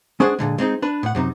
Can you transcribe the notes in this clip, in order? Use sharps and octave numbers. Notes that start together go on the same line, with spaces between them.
G#3 C#4 D4 G#4 C5 F#5
A#2 D3 G#3
G#3 C4 D4 D#4
D4 B4
A2 F#5
F#2 C3 D#4